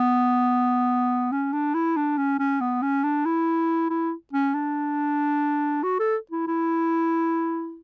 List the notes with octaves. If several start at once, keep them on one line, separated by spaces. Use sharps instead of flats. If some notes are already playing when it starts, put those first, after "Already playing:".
Already playing: B3
C#4
D4
E4
D4
C#4
C#4
B3
C#4
D4
E4
E4
C#4
D4
F#4
A4
E4
E4